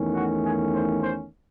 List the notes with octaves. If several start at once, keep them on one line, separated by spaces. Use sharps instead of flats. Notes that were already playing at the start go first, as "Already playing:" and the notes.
Already playing: E2 D#3 A3 C#4
F#4
G#4
C5
C5